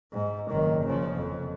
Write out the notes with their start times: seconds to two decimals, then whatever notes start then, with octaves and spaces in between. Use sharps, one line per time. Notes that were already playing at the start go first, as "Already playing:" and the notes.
0.13 G#2
0.51 F#1 D#3
0.85 C#3 F3
1.17 F2